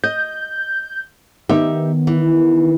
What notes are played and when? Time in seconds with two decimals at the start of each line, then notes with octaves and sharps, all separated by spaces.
0.04 D#5 G6
1.49 D#3 B3 D#4 G4 E5
2.07 E3